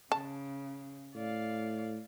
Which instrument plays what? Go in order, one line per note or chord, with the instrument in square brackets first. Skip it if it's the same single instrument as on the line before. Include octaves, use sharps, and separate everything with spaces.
[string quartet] C#3 [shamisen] A5
[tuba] A2 [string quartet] D5 F5